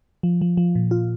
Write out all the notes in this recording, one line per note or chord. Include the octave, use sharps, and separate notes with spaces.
F3
F3
F3
A#2
F4